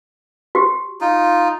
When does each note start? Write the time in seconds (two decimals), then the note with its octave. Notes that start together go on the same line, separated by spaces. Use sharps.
0.55 F#4 G4
1.01 D#4 F4